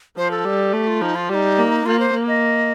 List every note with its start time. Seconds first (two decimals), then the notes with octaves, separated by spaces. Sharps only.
0.17 F3 C5
0.31 A4
0.45 G3
0.73 A3 G4
0.87 F4
1.01 F3 D#4
1.15 F4
1.29 G3 F4
1.34 D#4
1.58 A#3
1.86 A#3 F4
1.99 C5
2.14 A#3
2.28 D#5